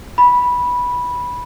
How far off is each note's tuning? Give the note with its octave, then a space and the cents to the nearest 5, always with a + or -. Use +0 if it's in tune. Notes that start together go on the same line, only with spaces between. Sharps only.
B5 -10